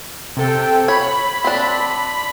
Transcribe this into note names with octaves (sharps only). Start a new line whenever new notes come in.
C3 A4 G5
C#5 B5
C4 D4